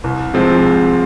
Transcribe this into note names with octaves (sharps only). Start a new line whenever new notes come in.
C2
C3 F3 G#3 C4